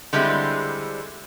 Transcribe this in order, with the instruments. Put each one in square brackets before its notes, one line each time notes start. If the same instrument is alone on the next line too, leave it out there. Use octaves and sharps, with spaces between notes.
[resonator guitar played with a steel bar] D3 G3 G#3 C4 E4